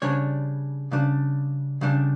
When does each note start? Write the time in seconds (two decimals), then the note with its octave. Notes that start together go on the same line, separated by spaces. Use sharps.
0.02 C#3 G3 D4 C#5
0.91 C#3 G3 D4
1.81 C#3 G3 D4